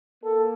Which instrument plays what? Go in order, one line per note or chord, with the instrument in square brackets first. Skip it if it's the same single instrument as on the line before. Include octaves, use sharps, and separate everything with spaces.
[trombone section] A#3 A4